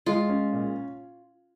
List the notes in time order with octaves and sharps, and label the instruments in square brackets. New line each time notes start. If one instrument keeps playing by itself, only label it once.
[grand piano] G#3 [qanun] F4
[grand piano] C#4
A#2